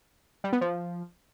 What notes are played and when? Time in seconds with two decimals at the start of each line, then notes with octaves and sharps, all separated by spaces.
0.44 G3
0.53 B3
0.61 F3